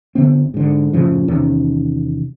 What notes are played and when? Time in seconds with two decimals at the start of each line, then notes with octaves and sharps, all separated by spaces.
0.15 G1 D3 B3 C4
0.54 G#2 D3
0.93 F#2 A2 C#3 F3
1.28 E2 C3 D#3 C#4